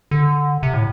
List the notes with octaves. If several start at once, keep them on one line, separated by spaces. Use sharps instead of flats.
D3
C3
A2